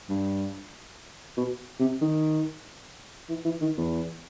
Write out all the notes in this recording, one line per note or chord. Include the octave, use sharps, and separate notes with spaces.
G2
B2
C3
D#3
E3
E3
D#3
E2